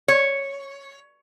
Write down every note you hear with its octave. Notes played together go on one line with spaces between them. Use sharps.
C#5